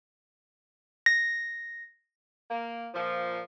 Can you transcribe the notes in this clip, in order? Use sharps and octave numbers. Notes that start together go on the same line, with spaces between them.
A#6
A#3
A#2 F3